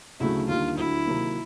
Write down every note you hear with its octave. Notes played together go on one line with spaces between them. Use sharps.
D2 C#3 F#3 A3 E4
D#2 D3 G3 A#3 F4
D2 D3 F#3 E4
C3 D#3 F#3 A#3